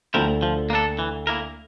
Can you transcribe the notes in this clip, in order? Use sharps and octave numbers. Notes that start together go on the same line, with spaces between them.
D2 D3 F3 C4 E4 A#4
F3
A#3 D4 A4
E3
A#3 E4 A#4